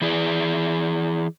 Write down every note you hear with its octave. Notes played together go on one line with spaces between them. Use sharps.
E3 E4 G#4 D5